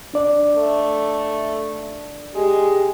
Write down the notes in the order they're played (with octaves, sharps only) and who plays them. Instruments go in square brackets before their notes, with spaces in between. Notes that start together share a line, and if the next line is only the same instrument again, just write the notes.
[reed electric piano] D4 D5
[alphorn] A3
[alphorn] G#3 [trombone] G4